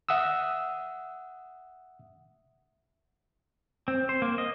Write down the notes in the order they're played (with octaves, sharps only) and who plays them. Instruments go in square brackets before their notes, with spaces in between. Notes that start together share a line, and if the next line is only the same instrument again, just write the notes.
[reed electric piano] E5 F#5 D#6 E6
[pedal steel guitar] C4
C5
A#3
D#5